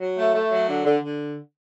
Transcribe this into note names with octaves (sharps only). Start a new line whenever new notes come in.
F#3
A3
A3
F#3
D3
D3
D3